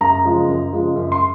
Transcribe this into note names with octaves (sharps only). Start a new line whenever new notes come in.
F#2 A#5
C#3 F3 G#3
F#2
C#3 F3 G#3
F#2
C6